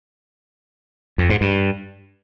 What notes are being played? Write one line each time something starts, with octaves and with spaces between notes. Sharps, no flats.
F2
G#2
G2